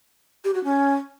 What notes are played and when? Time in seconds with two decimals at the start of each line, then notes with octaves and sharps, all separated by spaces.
0.44 G4
0.54 F#4
0.64 C#4